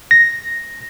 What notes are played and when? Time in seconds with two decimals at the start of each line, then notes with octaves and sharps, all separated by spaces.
0.11 A#6